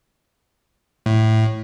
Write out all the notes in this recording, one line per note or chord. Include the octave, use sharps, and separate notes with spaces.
A2